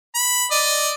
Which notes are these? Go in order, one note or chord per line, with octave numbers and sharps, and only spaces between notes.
B5
D5 D#5